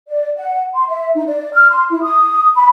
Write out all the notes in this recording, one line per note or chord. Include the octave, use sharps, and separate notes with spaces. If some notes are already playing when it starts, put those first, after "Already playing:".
D5
F#5
C6
E5
D#4
D5
F6
C6
E4
D#6
B5